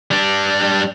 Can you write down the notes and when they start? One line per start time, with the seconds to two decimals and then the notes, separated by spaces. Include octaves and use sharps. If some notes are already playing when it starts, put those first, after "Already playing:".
0.11 G3 D4